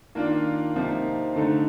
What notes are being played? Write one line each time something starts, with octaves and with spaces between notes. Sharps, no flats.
D#3 A#3 D4 F4
C3 F3 A#3 D#4
D3 A3 D#4